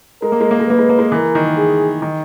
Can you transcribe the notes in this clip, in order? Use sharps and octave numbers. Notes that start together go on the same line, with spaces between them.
G#3 A#4
A#3
G#3
A#3
G#3
A#3 B4
G#3
A#3
G#3
E3 A#4
D#3
G#4
D#3